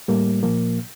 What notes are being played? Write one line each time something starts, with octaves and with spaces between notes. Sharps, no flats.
A2 G3 A#3
A#2 F3 A#3